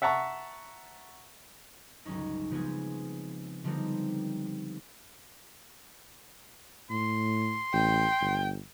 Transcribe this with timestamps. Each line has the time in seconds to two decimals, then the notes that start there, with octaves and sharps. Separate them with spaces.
0.02 E5 F#5 A5 A#5 C#6
2.05 G1 C#2 F#3 C#4 D#4
2.51 C#3 F3 G#3 B3 C4 G#4
3.64 D3 F3 G3 B3 C4 D#4
6.90 A2 C6
7.74 A1 G5
8.21 G1